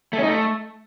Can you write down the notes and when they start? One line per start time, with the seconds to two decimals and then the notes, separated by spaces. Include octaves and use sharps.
0.13 A3
0.18 C#4
0.23 D#4
0.29 A3